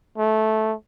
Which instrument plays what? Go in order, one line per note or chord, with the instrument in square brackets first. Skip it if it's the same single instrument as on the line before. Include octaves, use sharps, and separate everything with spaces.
[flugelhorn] A3